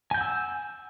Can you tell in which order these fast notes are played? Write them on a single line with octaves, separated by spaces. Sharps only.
G#5 G6 F#5 E6